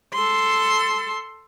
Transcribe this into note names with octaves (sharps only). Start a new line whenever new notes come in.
A4 C6